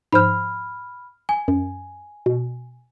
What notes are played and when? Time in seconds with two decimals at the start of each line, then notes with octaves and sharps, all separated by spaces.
0.13 G#2 F3 C5 B5 F6
1.29 G#5
1.48 F#2
2.26 B2